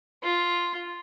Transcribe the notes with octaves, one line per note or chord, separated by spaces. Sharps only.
F4